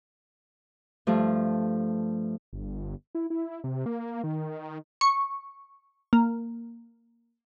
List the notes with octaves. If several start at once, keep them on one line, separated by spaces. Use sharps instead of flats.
G2 F3 A3
G1
E4
E4
C3
A#3
D#3
C#6
A#3